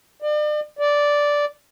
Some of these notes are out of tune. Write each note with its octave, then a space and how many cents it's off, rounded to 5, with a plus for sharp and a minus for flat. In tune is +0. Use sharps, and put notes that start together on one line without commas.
D5 +40
D5 -5